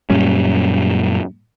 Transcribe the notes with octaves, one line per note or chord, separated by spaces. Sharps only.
F#2 A#2 G3 C#4